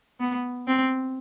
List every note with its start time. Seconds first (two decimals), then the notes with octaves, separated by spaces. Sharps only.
0.20 B3
0.67 C4